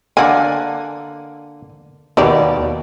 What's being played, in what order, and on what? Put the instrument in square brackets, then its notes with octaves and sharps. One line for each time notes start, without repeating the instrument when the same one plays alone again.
[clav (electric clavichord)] D3 A#3 [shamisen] D5 F#5 G#5
[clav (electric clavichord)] D#2 B2 [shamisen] D#4 G4 D5